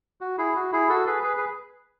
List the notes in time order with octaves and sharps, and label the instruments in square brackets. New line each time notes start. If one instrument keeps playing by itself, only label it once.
[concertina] F#4
E4 G#4
F#4
E4 G#4
F#4 A4
G#4 B4
G#4 B4
G#4 B4